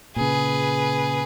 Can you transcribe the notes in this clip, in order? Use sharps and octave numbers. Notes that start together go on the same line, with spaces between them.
A#2 C#3 G#4 B4